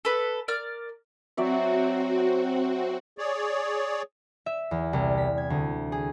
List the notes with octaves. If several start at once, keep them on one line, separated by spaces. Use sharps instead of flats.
A4 B4
A#4 D5 F6
F#3 C4 F#4 D5 E5
G#4 C#5 D5
E5
E2
C2
B6
G#6
D2
G#4